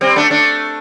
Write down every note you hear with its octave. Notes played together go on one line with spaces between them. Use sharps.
G3 C4
A3 D4
A3 D4